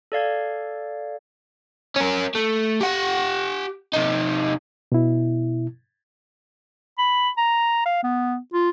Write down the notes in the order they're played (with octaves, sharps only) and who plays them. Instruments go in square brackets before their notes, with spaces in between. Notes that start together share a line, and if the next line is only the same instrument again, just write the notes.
[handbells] A4 D5 F5 G#6
[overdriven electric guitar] C#4 A#4
A3
G4 F#5
C3 D#4
[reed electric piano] B2 E4
[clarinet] B5
A#5
F5
B3
F4